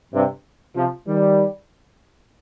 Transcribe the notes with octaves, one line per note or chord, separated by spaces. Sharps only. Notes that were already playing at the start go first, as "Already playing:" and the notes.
G2 C3
C3 F3
D#3 G3